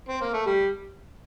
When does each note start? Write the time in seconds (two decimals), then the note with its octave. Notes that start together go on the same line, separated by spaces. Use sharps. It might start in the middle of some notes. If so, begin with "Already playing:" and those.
0.09 C4
0.21 A#3
0.34 A3
0.46 G3